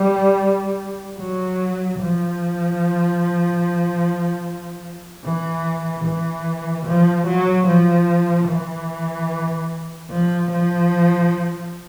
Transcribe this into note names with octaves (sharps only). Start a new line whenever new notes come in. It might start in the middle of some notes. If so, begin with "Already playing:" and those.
Already playing: G3
F#3
F3
E3
E3
F3
F#3
F3
E3
F3
F3